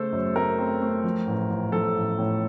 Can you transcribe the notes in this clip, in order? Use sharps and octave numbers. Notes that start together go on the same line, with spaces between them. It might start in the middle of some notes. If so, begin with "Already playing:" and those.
Already playing: C#3 A3 A4 C5
F#2
A3 A#4
C4
A3
F3
A1
A1
F3 A4
A1
A2